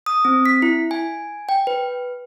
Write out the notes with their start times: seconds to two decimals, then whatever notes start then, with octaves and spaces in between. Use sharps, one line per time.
0.06 D#6
0.25 C4
0.46 B6
0.62 E4
0.91 G#5
1.49 G5
1.67 B4